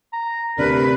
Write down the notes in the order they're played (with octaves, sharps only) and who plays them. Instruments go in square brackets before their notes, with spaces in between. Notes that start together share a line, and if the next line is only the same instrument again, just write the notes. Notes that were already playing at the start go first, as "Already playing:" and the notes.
[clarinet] A#5
[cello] D2 B4 [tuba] C3 [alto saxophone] D4 [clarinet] A#4